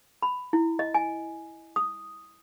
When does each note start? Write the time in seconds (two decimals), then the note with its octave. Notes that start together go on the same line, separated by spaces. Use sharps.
0.22 B5
0.53 E4
0.79 D#5
0.94 G#5
1.76 D#6